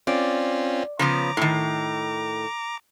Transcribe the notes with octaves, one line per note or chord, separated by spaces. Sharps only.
C4 C#4 F4 D5
C#3 F3 B3 A#5 D6
A2 D#3